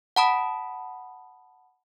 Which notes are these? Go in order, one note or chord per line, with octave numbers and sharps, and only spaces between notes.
F#5 A5 B5 D#6